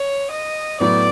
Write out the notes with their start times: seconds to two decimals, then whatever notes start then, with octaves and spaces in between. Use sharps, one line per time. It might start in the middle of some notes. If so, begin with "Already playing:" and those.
Already playing: C#5
0.31 D#5
0.80 A2 F#3 B3 D5